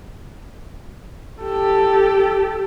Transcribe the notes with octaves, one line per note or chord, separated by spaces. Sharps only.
G4 A4